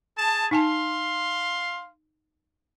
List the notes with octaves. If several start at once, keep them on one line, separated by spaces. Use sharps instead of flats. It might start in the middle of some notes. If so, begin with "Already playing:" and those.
G#4 A5
D#4 F5 G#5 A5 C6